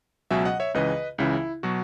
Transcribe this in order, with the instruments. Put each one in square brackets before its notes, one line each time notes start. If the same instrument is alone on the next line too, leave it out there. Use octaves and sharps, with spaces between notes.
[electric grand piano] C#2 B2 F#3 E5 G#5
D#5 F#5
C#5 E5
C#2 C#3 E3 B4 D#5
C#2 C#3 E3 E4
B2 F#3 F#4